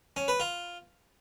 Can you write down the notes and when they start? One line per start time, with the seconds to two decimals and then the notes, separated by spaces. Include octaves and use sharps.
0.16 C#4
0.28 B4
0.40 F4